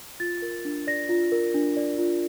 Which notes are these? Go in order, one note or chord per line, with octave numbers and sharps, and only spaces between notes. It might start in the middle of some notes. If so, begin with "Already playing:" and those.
F4 A6
A#4
D4
D5 A#6
F4
A#4
D4
D5
F4